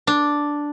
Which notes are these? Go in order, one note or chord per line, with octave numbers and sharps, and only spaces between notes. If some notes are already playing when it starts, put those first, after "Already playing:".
D4